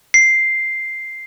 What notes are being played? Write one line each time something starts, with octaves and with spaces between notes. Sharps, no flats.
C7